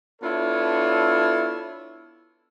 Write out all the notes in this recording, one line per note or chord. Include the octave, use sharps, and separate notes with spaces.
B3 D4 E4 F4 A4 C#5